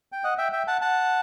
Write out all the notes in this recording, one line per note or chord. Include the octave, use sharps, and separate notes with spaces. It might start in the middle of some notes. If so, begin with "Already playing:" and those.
G5
D#5 F#5
E5 G5
E5 G5
F#5 A5
F#5 A5